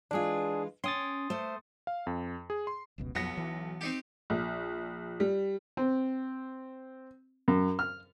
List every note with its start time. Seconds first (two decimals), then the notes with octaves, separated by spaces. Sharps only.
0.11 E3 G#3 D4 F4 G#4
0.84 C#4 G5 C6 D#6 A6
1.30 A3 C5
1.87 F5
2.07 F2
2.50 G#4
2.67 C6
2.98 F1 C#2 B2
3.15 B1 F2 B3 A#6 C#7
3.37 E3
3.81 C4 D#4 G4
4.30 A#1
5.20 G3
5.77 C4
7.48 F#2
7.79 F6